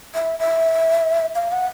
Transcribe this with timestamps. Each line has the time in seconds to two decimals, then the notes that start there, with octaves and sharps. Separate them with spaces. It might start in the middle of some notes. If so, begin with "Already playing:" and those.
0.15 E5
0.39 E5
1.35 F5
1.52 F#5